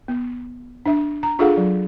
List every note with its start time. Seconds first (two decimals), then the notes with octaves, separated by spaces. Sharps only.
0.08 B3
0.86 D4 E5
1.23 A#5
1.39 D4 F4 G#4 A4 F5 F#5
1.57 F#3